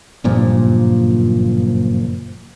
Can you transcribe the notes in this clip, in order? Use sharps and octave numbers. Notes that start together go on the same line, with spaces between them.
F#1 G2 A#2 F3